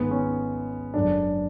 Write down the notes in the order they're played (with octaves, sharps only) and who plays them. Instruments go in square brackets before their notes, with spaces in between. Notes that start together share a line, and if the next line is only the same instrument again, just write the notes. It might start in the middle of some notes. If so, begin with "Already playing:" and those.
Already playing: [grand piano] G#1 G#2 G#3 B3
C#4
F#1 F#2 D3 G#3 D4